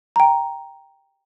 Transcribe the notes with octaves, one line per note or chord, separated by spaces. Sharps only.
G5 A#5